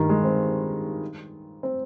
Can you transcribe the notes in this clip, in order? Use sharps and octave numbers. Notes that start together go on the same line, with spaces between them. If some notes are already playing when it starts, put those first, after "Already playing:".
Already playing: G2 D#3
G#3
C4
C4